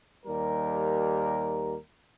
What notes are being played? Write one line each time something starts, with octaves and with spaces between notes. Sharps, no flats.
D#2 G3 A#4